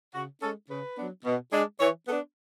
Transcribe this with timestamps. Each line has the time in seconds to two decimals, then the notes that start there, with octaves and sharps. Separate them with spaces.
0.15 C#3 F#4
0.42 G#3 C#4 A4
0.70 C#3 B4
0.98 F#3 B3 D4
1.25 B2
1.53 G#3 D4
1.80 E3 C#5
2.07 B3 A4
2.11 D4